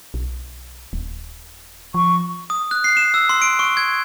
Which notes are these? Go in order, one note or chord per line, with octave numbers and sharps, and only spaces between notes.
B1
D#1
F3 C#6
D#6
F#6
C7
E7
E6
C6
D7
C#6
G#6